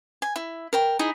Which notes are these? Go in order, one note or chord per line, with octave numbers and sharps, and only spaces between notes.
G#5
E4
A#4 G5
D#4 E4 G#4